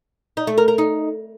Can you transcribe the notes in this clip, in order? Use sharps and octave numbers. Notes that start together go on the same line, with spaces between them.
D#4
A3
A#4
A#4
D#4